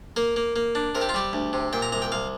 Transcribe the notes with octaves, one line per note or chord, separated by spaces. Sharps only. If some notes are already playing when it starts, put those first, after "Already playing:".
A#3 A#4
A#3
A#3
D4
C3 A#4
G4
F4
G3 G4
D2
C3
A#2 G5
A#5
C2 A#5
G5
C2 F5